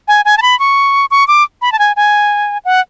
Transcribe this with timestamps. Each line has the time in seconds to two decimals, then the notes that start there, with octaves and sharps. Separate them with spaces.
0.08 G#5
0.25 G#5
0.38 A5
0.42 B5
0.60 C#6
1.11 C#6
1.28 D6
1.62 B5
1.72 A5
1.79 G#5
1.96 G#5
2.65 F#5